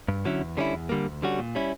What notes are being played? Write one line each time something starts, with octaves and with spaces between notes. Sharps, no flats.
G2
D3 F#3 C#4 E4
E2
D3 G3 C#4 E4
E2
D3 G3 A#3
D2
D3 G3 C#4 F#4
A#2
G3 C#4 E4